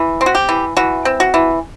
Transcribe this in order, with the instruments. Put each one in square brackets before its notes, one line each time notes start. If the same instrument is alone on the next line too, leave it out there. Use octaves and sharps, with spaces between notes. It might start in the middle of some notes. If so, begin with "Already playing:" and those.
Already playing: [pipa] E3
C4
F#4
G4
E3
E3 F#4
C4
F#4
E3